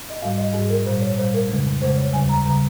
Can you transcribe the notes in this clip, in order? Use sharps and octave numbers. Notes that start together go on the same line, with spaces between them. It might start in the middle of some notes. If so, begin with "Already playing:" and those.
D#5
G#2 G3 F5
D#5
G#2 G3 G#4
A#4
A#2 G3 C5
C#5
A#2 G3 C5
A#4
F2 C#3 G#3
F2 C#3 G#3 C5
C#5
D#2 C#3 G3 G#5
A#5
C#3 G3 A#5